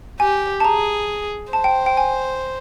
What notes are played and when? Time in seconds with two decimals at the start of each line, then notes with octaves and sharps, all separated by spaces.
0.20 G4 G#5
0.60 A5
0.64 G#4 A#5
1.53 C5 A5
1.64 G5
1.86 G5
1.97 G#5